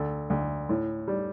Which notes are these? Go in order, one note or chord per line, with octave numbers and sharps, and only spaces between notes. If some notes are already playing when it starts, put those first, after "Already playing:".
Already playing: D2 A4
D2
A2
G3